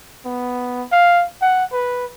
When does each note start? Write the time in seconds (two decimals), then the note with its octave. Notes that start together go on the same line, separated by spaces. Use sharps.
0.25 B3
0.92 F5
1.42 F#5
1.72 B4